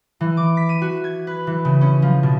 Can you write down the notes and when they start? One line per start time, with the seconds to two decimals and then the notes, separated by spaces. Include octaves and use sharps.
0.21 E3
0.37 D6
0.57 B6
0.69 D#7
0.82 F#4
1.04 G#6
1.27 B4
1.47 E3
1.65 C#3
1.81 C#4
2.02 F3
2.23 B2